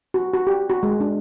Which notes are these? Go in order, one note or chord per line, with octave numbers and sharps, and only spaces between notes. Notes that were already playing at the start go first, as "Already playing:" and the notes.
F#4
F#4
G4
F#4
G#3
D4